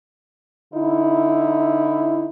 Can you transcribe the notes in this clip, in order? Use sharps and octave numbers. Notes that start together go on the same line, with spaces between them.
D3 D#4 E4